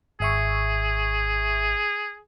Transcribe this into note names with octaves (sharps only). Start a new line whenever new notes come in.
G#1 G#4 E5 C#6